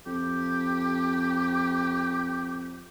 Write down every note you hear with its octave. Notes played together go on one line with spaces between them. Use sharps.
F2 G4